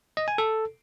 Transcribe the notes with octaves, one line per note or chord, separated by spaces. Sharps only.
D#5
G#5
A4